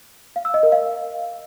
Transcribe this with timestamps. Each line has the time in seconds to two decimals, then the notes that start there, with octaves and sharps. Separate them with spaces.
0.36 F5
0.45 E6
0.54 D#5
0.63 A#4
0.72 F5